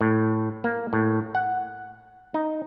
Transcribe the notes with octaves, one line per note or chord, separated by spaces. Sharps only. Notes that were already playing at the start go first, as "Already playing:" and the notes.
A2
A#3
A2
F#5
D#4